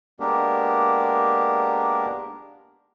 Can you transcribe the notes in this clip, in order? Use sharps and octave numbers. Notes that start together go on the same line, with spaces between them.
G#3 A#3 B3 D4 G4 A#4